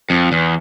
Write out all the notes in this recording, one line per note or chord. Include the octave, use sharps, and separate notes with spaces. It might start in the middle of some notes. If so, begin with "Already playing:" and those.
F2
E2